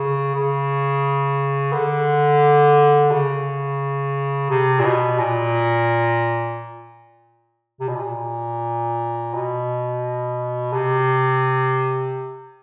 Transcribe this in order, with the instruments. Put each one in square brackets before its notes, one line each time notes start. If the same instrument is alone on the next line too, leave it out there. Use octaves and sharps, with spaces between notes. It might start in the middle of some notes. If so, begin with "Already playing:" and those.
Already playing: [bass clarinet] C#3
C#3
D3
C#3
C3
A#2
B2
A#2
C3
B2
A#2
B2
C3